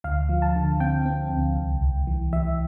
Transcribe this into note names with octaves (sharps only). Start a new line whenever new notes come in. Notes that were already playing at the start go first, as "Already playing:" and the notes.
D2 F5
F3
A5
D3
C4 G5
C4
D2
C2
C2
E3
E3 E5